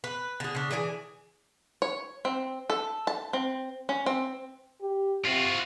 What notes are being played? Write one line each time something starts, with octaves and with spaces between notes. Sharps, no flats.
B4
D3 G#4
C#3 D4
E3 G#4 D5 G#5
C#5
C4
A4
A5
C4
C#4
C4
G4
C3 F4 F#4